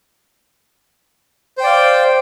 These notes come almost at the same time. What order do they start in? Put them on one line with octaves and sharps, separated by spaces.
C5 G5 D5 F5